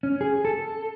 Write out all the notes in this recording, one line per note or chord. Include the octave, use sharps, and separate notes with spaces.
C#4
G#4
A4